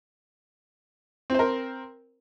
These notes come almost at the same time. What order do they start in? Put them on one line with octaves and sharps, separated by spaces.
C4 C5 A#4